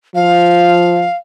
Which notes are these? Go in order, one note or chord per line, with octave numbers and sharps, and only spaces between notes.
F3 F5